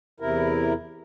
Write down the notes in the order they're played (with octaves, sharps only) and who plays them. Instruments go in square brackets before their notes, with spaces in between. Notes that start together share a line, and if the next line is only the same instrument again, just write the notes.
[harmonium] E2 C3 E4 A#4